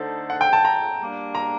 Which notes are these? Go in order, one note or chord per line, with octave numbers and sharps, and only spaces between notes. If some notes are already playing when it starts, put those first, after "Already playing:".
Already playing: D3 A3 D#4 A4 C5
F#5
G5
A5
A#5
G3 A#3 D4
A#5